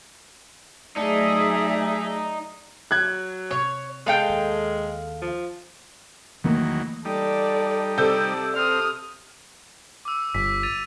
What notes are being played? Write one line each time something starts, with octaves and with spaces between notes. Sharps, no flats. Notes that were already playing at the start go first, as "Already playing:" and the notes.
F#3 A3 D#4 G#4 D5 E5 D#6
F#3 F#6 G#6
C3 C#5
G#3 A4 F5 G5
D#2
F3
E2 D#3 E3 F#3 A3 A#3
G3 D#4 A4 D5
C3 A4 D5 G6
C4 D#6 F6
D6 E6
G1 B6
A6 D#7 F7